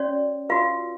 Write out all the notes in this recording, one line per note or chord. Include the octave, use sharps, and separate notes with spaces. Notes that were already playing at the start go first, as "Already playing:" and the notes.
Already playing: C#4 F#4 C#5 D5
F4 F#4 B4 F5